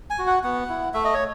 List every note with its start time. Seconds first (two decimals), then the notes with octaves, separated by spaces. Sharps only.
0.10 G#5
0.18 F#4
0.27 F#5
0.44 B3 F#5
0.69 E4
0.94 A3 E5
1.05 D#5
1.14 C#5